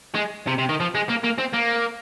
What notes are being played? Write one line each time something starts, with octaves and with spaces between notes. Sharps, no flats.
G#3
C3
C3
D#3
F3
G#3
A#3
A#3
C4
A#3